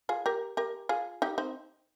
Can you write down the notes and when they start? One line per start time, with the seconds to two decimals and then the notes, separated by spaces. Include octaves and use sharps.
0.09 F4 G#4
0.26 G4 A#4
0.57 G4 A#4
0.89 F4 G#4
1.22 D#4 G4
1.38 C4 D#4